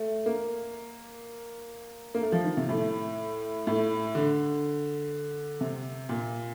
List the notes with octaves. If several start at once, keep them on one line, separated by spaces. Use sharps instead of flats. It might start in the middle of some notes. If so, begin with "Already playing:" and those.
Already playing: A3
A#3
A#3
A3
F3
D#3
C3
A2
A2
D3
C3
A#2